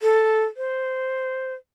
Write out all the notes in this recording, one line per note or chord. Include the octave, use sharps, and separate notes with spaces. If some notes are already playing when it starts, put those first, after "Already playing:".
A4
C5